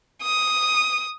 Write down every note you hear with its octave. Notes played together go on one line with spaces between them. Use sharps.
D#6